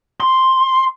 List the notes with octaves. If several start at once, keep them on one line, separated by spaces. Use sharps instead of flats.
C6